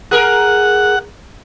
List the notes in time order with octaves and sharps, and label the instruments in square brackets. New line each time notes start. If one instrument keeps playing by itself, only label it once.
[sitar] G#4 A#4 [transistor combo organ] F#5